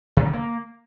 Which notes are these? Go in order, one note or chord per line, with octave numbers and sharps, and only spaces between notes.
C3
D3
A#3